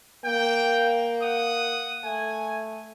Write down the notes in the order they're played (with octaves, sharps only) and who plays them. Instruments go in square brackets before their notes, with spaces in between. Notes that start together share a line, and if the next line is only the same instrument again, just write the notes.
[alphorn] A#3 [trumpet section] G5
[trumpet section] F#5 D#6
[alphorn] A3 [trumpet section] G#5